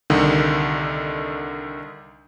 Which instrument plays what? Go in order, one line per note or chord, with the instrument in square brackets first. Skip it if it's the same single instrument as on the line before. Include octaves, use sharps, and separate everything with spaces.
[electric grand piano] C2 D3 D#3